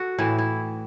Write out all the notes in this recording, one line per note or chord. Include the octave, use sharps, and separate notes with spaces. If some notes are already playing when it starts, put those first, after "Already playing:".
Already playing: F#4 A4
A2 E3 E4
E4